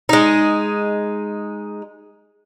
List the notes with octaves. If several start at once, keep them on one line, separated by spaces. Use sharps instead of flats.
G#3 D#4